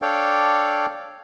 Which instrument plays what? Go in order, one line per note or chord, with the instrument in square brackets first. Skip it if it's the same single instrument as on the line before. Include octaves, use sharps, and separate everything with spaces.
[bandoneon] D4 A4 C#5 D5 F5 G5